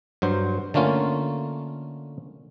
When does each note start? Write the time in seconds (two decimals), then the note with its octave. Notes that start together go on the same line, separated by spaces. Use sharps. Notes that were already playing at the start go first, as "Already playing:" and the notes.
0.22 G2 F#3 C5
0.74 D3 A3 A#3 C#4 F4